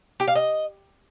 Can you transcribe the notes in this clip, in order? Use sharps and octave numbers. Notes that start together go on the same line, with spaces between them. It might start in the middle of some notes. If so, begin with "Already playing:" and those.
G4
F5
D#5